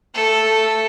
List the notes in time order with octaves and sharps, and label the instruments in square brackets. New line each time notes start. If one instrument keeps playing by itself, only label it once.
[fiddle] A3 A4